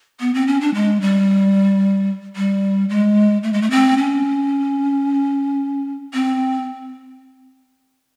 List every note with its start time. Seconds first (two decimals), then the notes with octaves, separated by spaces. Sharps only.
0.20 B3
0.34 C4
0.47 C#4
0.61 D4
0.74 G#3
1.01 G3
2.36 G3
2.89 G#3
3.43 A3
3.53 G#3
3.62 A3
3.71 C4
3.98 C#4
6.14 C4